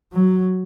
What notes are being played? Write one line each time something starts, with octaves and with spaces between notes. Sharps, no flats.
F#3